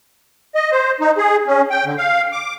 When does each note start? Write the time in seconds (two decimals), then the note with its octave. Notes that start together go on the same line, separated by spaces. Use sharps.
0.55 D#5
0.72 C5
1.00 D#4
1.18 G#4
1.47 C#4
1.71 G5
1.85 D3
1.98 F5
2.32 D6